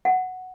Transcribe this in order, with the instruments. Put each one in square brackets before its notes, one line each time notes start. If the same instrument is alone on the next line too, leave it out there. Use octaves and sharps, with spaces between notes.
[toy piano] F#5